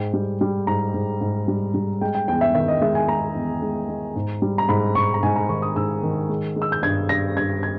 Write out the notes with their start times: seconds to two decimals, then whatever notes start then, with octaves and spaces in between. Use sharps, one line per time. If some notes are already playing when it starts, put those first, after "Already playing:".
Already playing: G#2 G5
0.13 G3
0.41 G3
0.67 G#2 A#5
0.94 G#2
1.21 G#2
1.48 G3
1.74 G3
2.01 G#3 G5
2.15 G5
2.28 E2 G5
2.41 E5
2.55 D#3 E5
2.68 D#5
2.81 G#3 E5
2.95 G#5
3.08 G#3 A#5
3.35 E2
3.62 G#3
3.89 G#3
4.16 G#2
4.42 G3
4.58 A#5
4.69 G#2 B5
4.95 G#2 C#6
5.14 A#5
5.23 G#2 G#5
5.36 A#5
5.49 D#3 C#6
5.62 D#6
5.76 G#2 E6
6.03 D#3
6.29 G#3
6.56 G#3
6.62 E6
6.72 G6
6.83 G2 G#6
7.09 G2 A#6
7.37 G2 G#6
7.63 G#6